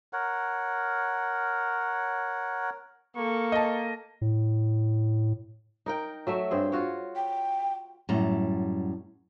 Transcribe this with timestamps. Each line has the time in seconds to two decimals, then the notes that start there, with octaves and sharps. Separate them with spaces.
0.13 A#4 C#5 F#5
3.16 A#3 A4 C#6
3.52 D#5 A5
4.21 A2
5.86 D#4 A#4 G5
6.27 F#3 A3 E5
6.51 G2 C4 G#4
6.72 F4 F#4 C#5
7.16 G5
8.09 F#2 A2 G3 F#5 A5 A#5